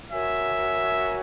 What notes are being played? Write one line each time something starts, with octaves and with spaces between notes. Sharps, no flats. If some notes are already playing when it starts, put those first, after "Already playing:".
F#4 A#4 C#5 E5 G#5